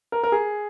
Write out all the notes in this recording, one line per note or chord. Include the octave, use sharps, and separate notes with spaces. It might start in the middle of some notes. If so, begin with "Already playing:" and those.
A#4
A#4
G#4